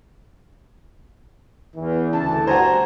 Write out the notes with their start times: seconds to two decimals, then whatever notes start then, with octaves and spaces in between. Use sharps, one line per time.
1.75 E2 E3
2.13 D2 C#3 A5
2.47 G2 F#4 C5 G#5 A#5